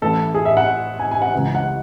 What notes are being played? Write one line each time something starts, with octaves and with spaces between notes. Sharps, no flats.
A1 A2 E3 A4
G#4
E5
F#5
G#5
G#5
F#5
C#2 C#3 E3
F#5